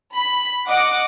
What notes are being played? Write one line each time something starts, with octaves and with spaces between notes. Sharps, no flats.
B5
D#5 F#5 D6